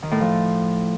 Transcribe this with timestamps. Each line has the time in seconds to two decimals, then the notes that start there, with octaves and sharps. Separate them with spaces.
0.03 D#3
0.11 A2
0.20 F3